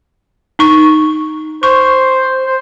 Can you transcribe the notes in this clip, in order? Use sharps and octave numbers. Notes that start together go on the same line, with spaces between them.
D#4 C#6
C5 C#6
C5